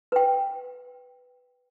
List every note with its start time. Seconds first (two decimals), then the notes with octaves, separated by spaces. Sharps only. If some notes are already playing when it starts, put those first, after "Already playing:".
0.12 B4 G5